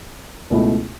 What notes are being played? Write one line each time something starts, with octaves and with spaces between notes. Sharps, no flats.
C#2 B2 A3 E4